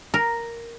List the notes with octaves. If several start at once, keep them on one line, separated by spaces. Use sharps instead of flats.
A#4